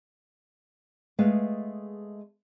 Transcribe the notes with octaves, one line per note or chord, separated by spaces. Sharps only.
G#3 A3 B3 G#4 B4 F5